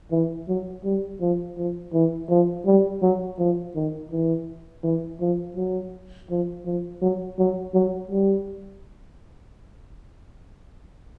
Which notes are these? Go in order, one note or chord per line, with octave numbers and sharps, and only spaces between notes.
E3
F#3
G3
F3
F3
E3
F3
G3
F#3
F3
D#3
E3
E3
F3
F#3
F3
F3
F#3
F#3
F#3
G3